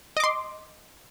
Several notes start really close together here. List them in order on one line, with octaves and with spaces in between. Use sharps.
D#5 D6 C6